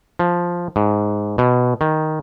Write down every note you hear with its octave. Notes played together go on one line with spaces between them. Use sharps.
F3
G#2
B2
D#3